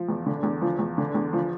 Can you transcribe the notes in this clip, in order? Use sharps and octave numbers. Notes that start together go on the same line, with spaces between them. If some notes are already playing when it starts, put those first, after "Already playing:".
Already playing: F3
E2
D3
E2
F3
E2
D3
E2
F3